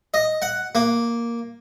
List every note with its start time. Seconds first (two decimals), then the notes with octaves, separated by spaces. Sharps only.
0.14 D#5
0.42 F#5
0.75 A#3